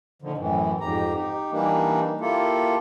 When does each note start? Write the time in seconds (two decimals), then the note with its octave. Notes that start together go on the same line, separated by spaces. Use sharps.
0.22 A#2 D3 D#3 F3
0.38 F#2 A2 E3
0.81 F2 G#2 G4 A#5
1.16 D#4 G4
1.52 E3 G3 A#3 D4 D#4
2.21 A#3 E4 F4 G4 A4